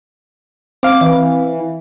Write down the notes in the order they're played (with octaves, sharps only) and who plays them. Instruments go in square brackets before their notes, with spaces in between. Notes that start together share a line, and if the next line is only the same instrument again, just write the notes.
[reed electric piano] C4 F5 [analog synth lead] D6
[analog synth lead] E3